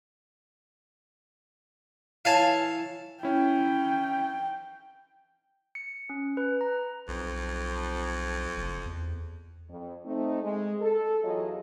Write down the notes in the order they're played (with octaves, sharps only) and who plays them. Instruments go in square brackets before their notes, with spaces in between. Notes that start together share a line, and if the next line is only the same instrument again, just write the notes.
[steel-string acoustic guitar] E3 E4 C#5 [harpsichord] F5 G#5 A5
[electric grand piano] C#4 E4 [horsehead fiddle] G5
[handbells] C#7
C#4
B4
A#5
[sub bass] B1 [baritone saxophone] F2
[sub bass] F#1
E2
[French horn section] F2
A3 C4 D#4
G#3
A4
E2 F#3 F4 G#4 C#5 D#5